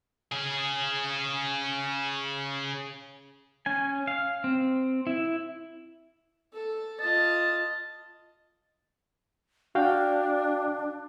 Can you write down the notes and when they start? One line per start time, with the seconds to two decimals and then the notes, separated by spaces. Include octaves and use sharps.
0.32 C#3 G#4
3.66 C#4 G#5
4.08 F5
4.44 C4
5.07 E4
6.53 A4
7.00 F4 D#5 A5
9.75 D4 F#4 F5 G5